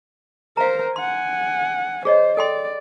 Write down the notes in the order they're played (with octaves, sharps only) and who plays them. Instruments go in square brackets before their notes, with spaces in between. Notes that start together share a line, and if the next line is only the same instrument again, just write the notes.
[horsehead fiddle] A#4 C5 [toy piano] F5 A#5
[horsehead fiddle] F#5 G#5 [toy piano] C6
[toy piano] G#4 C#5 D#5 [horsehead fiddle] C5
[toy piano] A4 G5 C6 [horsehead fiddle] D5